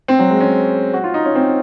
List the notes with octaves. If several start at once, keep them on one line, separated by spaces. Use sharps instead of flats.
C4
F#3
G#3
C#4
F#4
F4
D#4
C#4
C4